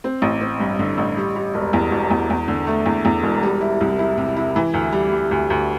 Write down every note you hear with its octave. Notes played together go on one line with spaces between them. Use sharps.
C4
A1
C4
G2
D3
A1
G3
G3
E1
E2
E1
E2
E2
D3
A3
E2
E2
E1
G3
E4
C2
E4
C3
E4
E3
D2
G3
G3
D2
D2